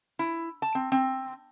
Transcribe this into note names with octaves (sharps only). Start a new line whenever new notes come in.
E4
A5
C4
C4